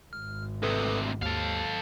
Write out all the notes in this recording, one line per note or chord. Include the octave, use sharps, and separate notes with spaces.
G#1 F6
D2 C3 A4 B4 D#6
D#2 A4 F5